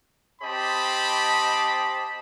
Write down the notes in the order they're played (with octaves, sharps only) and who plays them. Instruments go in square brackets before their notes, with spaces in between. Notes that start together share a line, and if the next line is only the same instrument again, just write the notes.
[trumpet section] C4 G4 C5 D#5 A5 B5